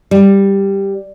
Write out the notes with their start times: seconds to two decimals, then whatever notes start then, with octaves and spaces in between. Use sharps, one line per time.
0.11 G3